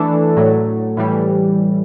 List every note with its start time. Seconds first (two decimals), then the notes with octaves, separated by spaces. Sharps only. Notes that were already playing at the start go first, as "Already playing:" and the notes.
Already playing: E3 A3 D4 A4
0.37 A2 F#3 A3
0.97 A2 E3 G3